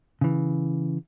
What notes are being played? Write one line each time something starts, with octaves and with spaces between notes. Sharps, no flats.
C#3 E3